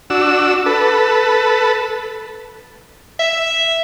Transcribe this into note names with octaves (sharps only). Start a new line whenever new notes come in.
D4 F#4 E6
A4 B4
E5